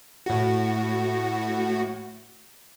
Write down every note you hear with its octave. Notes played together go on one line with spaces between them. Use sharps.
A2 F#4